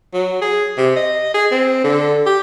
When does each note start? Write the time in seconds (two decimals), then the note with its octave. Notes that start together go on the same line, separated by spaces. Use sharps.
0.14 F#3
0.42 G#4
0.78 C3
0.96 D#5
1.34 G#4
1.51 C4
1.84 D3
2.26 G4